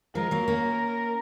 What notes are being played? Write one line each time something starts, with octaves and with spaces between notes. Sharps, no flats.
F3 G#3 A#4
F#3 A#3
A#3 C#4